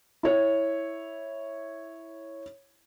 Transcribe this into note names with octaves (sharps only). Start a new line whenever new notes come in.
E4 C#5